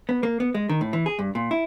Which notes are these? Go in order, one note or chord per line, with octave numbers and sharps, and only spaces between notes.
B3
A#3
B3
G#3
D#3
A2
E3
G#4
G2
A#2
E4